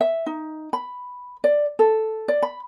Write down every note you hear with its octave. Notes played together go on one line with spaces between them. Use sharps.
E5
D#4
B5
D5
A4
D5
B5